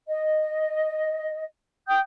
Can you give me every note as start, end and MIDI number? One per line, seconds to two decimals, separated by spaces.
0.07 1.42 75
1.87 1.98 79
1.87 1.98 87
1.87 1.98 91